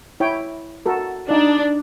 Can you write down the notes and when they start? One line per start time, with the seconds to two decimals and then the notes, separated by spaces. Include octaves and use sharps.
0.20 E4 C#5 G5
0.86 F#4 A4 A#4
1.29 D4 D#4 D5